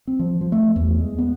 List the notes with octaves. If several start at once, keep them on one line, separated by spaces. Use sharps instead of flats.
C4
F3
F3
A3
E2
G#3
B3